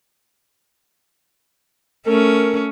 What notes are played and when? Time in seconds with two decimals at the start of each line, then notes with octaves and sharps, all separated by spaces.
2.07 A3 C#4 A#4